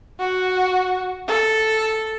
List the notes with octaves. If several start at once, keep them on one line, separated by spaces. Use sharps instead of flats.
F#4
A4